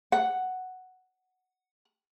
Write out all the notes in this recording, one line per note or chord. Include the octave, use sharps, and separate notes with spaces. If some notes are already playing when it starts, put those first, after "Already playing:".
F#5